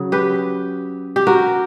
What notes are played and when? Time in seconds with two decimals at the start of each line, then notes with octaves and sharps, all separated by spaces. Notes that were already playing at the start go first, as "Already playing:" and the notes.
Already playing: C#3 F#3
0.12 G4 B4
1.16 G4
1.27 F#4 A#4